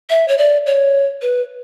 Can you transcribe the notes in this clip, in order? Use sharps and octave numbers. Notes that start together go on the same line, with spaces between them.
E5
C#5
D5
C#5
B4